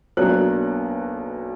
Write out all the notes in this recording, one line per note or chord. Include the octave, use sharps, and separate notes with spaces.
B1 B2 F#3 A#3 D4 F#6